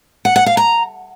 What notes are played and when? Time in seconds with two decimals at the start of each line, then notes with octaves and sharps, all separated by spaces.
0.25 F#5
0.36 F#5
0.46 F5
0.57 A#5